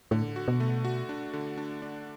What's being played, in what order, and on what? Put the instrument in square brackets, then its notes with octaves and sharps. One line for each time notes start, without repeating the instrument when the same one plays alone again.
[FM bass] A2 [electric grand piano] D3
[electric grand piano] F#4
[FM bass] B2
[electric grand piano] A3
F#4
D4
D3
D4
D4